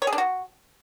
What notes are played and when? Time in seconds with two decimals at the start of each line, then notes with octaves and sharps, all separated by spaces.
0.02 C#5
0.07 G#4
0.13 D4
0.18 F#4